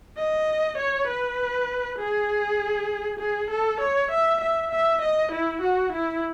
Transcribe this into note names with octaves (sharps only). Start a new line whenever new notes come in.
D#5
C#5
B4
G#4
G#4
A4
C#5
E5
E5
E5
D#5
E4
F#4
E4